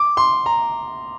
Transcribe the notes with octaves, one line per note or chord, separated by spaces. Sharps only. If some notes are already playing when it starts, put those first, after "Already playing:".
Already playing: D6
C6
A#5